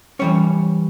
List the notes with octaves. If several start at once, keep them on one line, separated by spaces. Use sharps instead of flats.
E3 G3 C#4 C#5